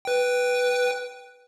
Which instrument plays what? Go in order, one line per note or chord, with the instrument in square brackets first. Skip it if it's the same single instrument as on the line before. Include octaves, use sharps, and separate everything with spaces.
[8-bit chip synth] B4 G5